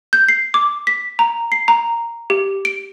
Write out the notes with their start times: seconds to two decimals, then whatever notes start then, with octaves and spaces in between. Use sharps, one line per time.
0.13 G6
0.28 C7
0.54 D6
0.87 B6
1.19 A#5
1.52 C7
1.68 A#5
2.30 G4
2.65 D7